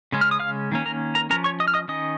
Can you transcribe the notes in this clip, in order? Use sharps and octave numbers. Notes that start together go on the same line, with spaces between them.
C#3 G#3 C#4
F6
D#6
F5 F6
D#3 A#3 C#4
A#4 A#5
A#4 A#5
F3 C#4 A#4 A#5
C#5 C#6
D#5 D#6
F6
D#5 D#6
D#3 C#4 D#5 D#6